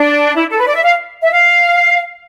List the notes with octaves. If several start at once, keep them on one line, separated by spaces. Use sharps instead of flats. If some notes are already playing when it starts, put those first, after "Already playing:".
Already playing: D4
E4
A4
B4
D5
E5
F5
E5
F5